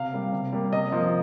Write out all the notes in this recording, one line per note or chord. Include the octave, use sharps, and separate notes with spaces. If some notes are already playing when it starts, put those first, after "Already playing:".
Already playing: C3 F5
G3 A#3
C3
G3 A#3
C3 D#5
F3 A#3